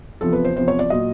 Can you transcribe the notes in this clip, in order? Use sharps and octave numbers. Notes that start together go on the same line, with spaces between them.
E2 C3 F3 A4
B4
C5
E2 C3 F3 C5
C#5
D5
A#2 F#3 D#5